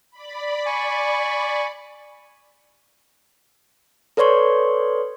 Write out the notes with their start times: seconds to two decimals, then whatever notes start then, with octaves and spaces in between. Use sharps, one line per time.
0.11 D5 B5
0.66 G#5 C#6
4.17 A4 B4 C#5 D5 C6 C#6